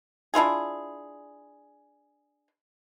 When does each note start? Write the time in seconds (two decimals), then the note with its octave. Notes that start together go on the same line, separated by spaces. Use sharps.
0.34 D4 E4 F4 G#4